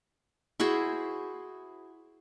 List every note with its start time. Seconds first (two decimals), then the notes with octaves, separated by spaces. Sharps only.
0.60 E4 F#4 G#4 C5